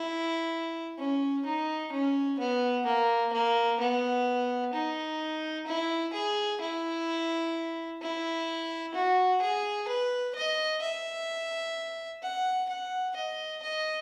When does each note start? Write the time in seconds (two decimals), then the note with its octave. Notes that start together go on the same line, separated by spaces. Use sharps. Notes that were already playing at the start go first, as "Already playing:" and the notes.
Already playing: E4
0.98 C#4
1.45 D#4
1.92 C#4
2.39 B3
2.86 A#3
3.33 A#3
3.79 B3
4.74 D#4
5.67 E4
6.13 G#4
6.61 E4
8.01 E4
8.94 F#4
9.42 G#4
9.88 B4
10.36 D#5
10.82 E5
12.23 F#5
12.69 F#5
13.16 D#5
13.63 D#5